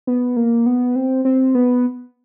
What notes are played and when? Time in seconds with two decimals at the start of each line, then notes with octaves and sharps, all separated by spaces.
0.07 B3
0.36 A#3
0.66 B3
0.95 C4
1.25 C4
1.55 B3